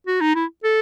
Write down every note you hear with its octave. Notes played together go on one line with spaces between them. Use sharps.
F#4
D#4
E4
A4